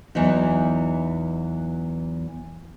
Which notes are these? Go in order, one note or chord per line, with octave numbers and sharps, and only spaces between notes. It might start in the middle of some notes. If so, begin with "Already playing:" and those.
E2 E3 F#3 B3 D#4